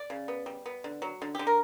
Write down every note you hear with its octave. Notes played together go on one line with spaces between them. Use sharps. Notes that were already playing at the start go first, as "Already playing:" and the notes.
Already playing: D5
C#3
B3
G3
B3
D3
F#3
D3
D3 G4
A#4